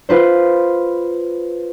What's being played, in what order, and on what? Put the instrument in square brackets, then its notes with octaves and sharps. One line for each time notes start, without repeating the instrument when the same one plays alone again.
[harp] F4 B4 C5